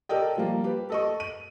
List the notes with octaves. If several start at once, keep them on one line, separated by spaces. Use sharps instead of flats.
G4 A4 A#4 D5 D#5 G5
F3 G3 A#3
G4 B4
A4 D#5 C#6
D#7